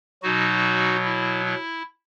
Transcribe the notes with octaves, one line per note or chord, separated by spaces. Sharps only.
B2 F#3 D#4 F#4
E4
E4